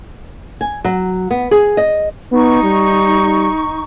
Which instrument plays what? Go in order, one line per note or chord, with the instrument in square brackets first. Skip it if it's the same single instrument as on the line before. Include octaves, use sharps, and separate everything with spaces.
[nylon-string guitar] G#5
F#3
B3
G#4
D#5
[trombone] B3 [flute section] D#4 C#6
[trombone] G3